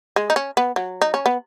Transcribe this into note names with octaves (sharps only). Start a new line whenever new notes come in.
G#3
D#4
C#4
B3
F#3
D#4
C#4
B3